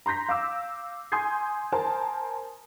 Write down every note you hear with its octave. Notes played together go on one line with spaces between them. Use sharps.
A#5 C6 G6 A#6 B6
F5 D6 E6
G#5 C6 D#6 G6 G#6 C7
A#4 C5 G#5 A5